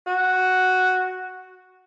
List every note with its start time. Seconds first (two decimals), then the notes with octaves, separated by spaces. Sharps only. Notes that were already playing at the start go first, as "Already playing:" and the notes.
0.07 F#4